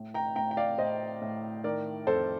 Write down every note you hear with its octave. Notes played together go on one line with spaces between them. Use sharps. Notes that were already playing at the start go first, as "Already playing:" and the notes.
Already playing: A2
G5 A#5
A2 G5 A#5
G5
D5 F5
A2 C5 D#5
A2
D#3 A#4 D5
F2 A4 C5